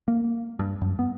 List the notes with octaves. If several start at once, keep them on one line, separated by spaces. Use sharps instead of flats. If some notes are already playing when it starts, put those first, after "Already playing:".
A#3
G2
F#2
B3